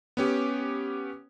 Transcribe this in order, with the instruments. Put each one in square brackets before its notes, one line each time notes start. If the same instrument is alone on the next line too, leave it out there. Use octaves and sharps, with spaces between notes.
[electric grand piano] B3 C#4 G4